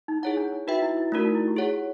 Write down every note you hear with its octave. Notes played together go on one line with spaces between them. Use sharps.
D#4
E4 G#4 C#5 F#5
D4
D4
D#4 F#4 B4 E5 G5
E4
E4
A3 D4 D#4 F#4 A#4
D#4
E4
G4
F#4 G#4 C#5 F#5